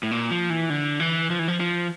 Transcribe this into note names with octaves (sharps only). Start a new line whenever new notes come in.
A2
A#2
F3
E3
D3
E3
F3
E3
F3
F3